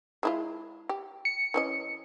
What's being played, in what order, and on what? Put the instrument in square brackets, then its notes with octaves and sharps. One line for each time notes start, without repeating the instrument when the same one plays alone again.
[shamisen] G#3 E4 F4
G4
[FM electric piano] C#7
[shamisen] E3 C#4 D#5